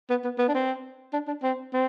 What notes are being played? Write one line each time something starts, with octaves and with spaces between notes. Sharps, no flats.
B3
B3
B3
D4
C4
D4
D4
C4
C4